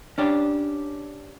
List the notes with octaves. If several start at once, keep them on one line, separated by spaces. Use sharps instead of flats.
C#4 D4 G4